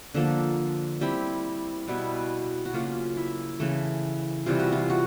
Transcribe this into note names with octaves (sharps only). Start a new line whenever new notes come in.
D3 F3 A#3 A4
G3 C4 E4 G4
B2 G3 B3 E4
F#4
C#3 F#3 A#3 C#4 F4
E4
C#3 E3 A3
C3 E3 G3 F4
F#4
F4
F#4